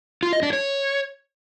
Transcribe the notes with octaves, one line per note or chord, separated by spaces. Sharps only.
F4
D#5
D4
C#5